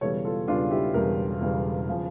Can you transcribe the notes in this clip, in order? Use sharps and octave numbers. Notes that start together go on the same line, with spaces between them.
E1 E2 C#3 G3 A4 C#5
F4 A4
E1 E2 C#3 G3 D4 F4
E4 G4
E1 E2 C#3 G3 G4 A#4
E1 E2 C#3 G3
C#3 F3